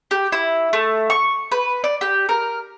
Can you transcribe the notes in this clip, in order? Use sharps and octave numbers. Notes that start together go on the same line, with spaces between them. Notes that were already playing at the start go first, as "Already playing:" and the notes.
G4
E4
A3
C#6
B4
D5
G4
A#4